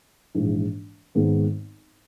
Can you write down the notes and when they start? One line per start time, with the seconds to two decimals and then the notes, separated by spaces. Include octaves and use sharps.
0.35 A#1 G#2 E3
1.15 G#1 G#2 D#3 G#3 B3